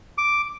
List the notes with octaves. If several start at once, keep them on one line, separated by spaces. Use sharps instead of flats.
D6